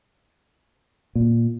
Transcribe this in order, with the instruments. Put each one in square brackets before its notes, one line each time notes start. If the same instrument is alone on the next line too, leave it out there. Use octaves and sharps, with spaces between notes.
[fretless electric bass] A#2